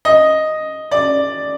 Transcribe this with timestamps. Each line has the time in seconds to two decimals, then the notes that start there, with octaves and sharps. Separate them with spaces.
0.05 D#5
0.91 D5